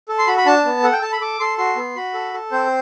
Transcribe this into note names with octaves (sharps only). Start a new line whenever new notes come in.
A4
C6
F#4 B5
B5
D4 A5
B3
A4 F#5
G5
A4 A5
B5
A4 D6
A4 C6
F#4 C6
B3
F#4 B5
A4
A4
C4 C5